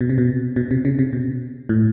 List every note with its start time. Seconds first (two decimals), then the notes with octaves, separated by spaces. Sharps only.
0.01 B2
0.09 C3
0.18 B2
0.56 B2
0.71 C3
0.85 C#3
0.99 C3
1.13 B2
1.69 A2